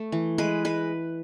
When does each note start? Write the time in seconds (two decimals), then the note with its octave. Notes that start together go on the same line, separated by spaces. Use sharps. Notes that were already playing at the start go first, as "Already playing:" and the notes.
Already playing: A3
0.12 E3
0.38 G#3 B4
0.65 G#3 B4